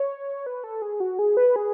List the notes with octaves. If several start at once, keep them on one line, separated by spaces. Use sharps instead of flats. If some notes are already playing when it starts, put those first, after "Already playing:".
Already playing: C#5
B4
A4
G#4
F#4
G#4
B4
G#4